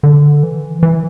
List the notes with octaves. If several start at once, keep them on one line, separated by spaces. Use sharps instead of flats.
D3
E3
E3